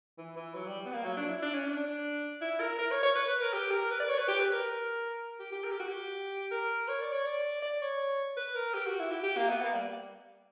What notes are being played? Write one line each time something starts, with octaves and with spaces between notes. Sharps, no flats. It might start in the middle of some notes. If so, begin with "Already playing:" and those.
E3
E3
F#3
G3
B3
A#3
F#3
D4
E4
D4
C#4
D4
E4
A#4
A#4
C#5
C#5
B4
B4
A#4
G4
A#4
B4
D5
C#5
B4
G4
B4
A#4
G4
G4
A#4
G4
F#4
G4
A#4
C#5
D5
C#5
D5
D5
C#5
B4
A#4
G4
F#4
E4
G4
G4
A#3
B3
A#3
G3